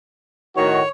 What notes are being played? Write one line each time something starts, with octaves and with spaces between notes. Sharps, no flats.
A2 D#3 F#4 C#5